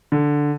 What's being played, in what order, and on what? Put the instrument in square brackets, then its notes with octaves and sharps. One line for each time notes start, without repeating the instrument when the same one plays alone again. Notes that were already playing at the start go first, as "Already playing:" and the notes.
[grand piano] D3